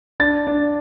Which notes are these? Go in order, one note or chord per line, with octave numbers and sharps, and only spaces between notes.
D4 A6
D4